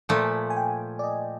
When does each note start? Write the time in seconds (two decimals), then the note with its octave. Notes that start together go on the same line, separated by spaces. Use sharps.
0.09 A#2 F3 A3 G#5
0.50 G#5
0.56 G5
0.99 D5
1.04 D#5